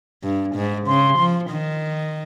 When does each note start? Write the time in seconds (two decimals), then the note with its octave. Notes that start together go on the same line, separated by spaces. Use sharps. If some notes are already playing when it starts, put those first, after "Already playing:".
0.23 G2
0.56 G#2
0.87 C#3 C6
1.18 F3
1.51 D#3